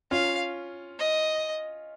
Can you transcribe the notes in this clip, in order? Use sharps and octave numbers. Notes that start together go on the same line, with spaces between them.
C#4 F4 F5
D#5